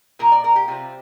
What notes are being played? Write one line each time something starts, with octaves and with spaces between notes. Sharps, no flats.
A#2 F3 A#3 A#4
D5
A#4
G4
C3 G3 C4 F4